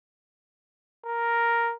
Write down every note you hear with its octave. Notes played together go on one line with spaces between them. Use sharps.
A#4